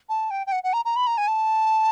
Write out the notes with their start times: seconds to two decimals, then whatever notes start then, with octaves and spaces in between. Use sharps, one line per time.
0.09 A5
0.30 G5
0.47 G5
0.52 F#5
0.63 F#5
0.73 A#5
0.85 A#5
0.96 B5
1.07 A#5
1.18 G#5
1.28 A5